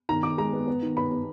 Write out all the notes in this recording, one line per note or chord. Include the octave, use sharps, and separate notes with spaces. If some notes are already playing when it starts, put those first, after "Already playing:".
D#3 A#5
D#3 D6
G#3 A#5
B3
B3
D#3
B3 B5
B3